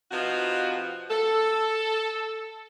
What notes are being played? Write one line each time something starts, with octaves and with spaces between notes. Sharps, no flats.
C3 F3 D#4 F4 F#4 B4
A4